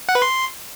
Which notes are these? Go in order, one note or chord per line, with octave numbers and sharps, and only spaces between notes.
F#5
B4
C6